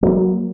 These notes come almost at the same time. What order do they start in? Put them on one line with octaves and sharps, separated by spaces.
F#3 G3 A#3